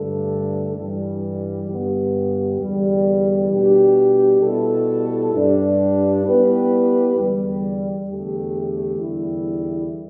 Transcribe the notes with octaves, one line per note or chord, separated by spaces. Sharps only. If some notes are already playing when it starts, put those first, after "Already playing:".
Already playing: G2 D3 A3 D4 A4
G2 E3 G3
G2 D3 B3 G4
E2 D3 G3
B2 G3 D4 G4
B2 G3 E4 A4
G2 G3 D4
G3 B3 E4 G4 B4
E2 D3 G3
E2 D3 A3 G4
E2 D3 G3 E4